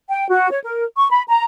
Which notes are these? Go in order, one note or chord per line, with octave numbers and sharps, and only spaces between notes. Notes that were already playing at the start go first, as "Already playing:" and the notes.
G5
F#4
C#5
A#4
C#6
B5
A#5